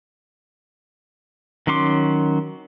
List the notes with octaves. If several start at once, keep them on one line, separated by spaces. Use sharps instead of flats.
D#3 F#3 C#4 C6 D6